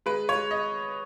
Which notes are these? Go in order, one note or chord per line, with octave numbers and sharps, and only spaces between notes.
G#3 B4
C#5
G#3
D#5